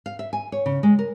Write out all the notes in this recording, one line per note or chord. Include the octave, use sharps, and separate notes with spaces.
F5
E5
G#5
C#5
C#3
G#3
A#4